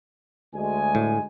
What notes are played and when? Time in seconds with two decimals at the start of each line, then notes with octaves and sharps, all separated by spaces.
0.55 D2 G#3 G#5
0.95 A2